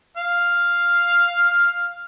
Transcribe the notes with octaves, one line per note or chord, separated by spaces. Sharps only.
F5 F6